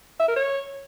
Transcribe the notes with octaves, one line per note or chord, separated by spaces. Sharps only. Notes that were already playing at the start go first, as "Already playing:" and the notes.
E5
A#4
C#5